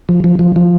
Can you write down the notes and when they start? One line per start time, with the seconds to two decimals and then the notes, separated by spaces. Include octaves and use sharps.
0.09 F3
0.24 F3
0.39 F3
0.56 F3